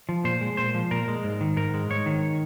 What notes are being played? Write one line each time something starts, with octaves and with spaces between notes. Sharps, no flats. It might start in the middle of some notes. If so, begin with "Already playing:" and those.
F3
A#2 C5
G#3
A#2 C5
F3
A#2 A#4
G#3
G#2
D#3
G#2 A#4
G#3
G#2 C#5
D#3